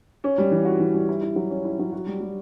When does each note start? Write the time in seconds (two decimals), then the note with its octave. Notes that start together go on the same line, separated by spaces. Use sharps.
0.24 C#4
0.38 G3
0.51 E3
0.65 F#4
0.80 E3
0.94 G3
1.09 E4
1.22 E4
1.36 F#3
1.50 C#4
1.65 E4
1.79 F#3
1.93 F#4
2.07 G3
2.20 G3